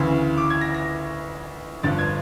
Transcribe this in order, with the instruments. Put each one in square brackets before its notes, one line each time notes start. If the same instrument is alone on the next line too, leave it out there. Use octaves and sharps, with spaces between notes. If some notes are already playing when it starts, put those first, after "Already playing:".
Already playing: [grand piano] D2 C#3 E3
D6
G#6
A#6
A#6
G1 G2 D3 F3 A6
G#6